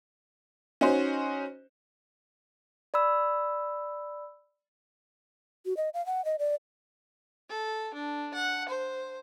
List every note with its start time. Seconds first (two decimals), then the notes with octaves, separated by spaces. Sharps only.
0.81 C#4 D#4 F#4 C5
2.94 D5 B5 E6
5.66 F#4
5.77 D#5
5.94 F5
6.06 F#5
6.25 D#5
6.39 D5
7.49 A4
7.94 D4
8.34 F#5
8.69 C5